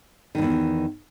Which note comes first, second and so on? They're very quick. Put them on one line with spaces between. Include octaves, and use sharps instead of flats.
D#3 G2 E2